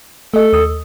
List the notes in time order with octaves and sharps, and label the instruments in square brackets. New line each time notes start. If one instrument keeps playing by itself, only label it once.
[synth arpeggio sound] A3 D#5 [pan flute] A4
[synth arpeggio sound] D#2 D#6 E6